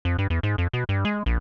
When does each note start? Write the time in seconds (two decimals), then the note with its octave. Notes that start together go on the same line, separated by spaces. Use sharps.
0.05 F2
0.18 G2
0.30 E2
0.43 G#2
0.58 F2
0.73 B2
0.89 G2
1.05 G#3
1.26 A#1